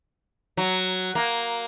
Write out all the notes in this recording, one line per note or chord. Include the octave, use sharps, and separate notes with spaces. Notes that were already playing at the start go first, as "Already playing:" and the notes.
F#3
A#3